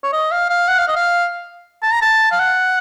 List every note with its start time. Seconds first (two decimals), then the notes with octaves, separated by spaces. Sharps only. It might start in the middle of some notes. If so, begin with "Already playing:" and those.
0.04 C#5
0.13 D#5
0.32 F5
0.50 F5
0.69 F#5
0.79 F5
0.88 D#5
0.97 F5
1.83 A5
1.93 A#5
2.02 A5
2.32 F5
2.40 F#5